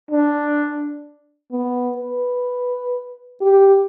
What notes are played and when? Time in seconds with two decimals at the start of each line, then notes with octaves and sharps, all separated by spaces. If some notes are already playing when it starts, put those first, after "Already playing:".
0.11 D4
1.52 B3
1.97 B4
3.41 G4